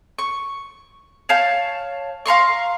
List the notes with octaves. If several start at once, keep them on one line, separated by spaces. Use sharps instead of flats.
C#6
C#5 F5 A5 G6
F5 A#5 C6 C#6